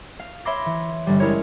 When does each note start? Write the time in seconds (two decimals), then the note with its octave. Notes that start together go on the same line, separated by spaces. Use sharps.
0.19 F5
0.45 C#5 E5 B5 C6 D6 A#6
0.66 E3
1.07 G1 G3
1.20 G#3 C#4 E4 A#4 C#5